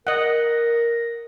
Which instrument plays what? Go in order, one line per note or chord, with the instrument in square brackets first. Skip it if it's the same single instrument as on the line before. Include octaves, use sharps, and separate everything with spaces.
[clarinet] A#4 [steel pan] D#5 F#5